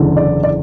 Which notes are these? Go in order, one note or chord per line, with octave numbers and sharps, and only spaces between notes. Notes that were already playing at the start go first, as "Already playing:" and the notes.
Already playing: F#1 E2 D3
D5
D5